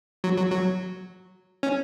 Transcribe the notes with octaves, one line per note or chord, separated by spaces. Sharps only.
F#3
F#3
F#3
C#4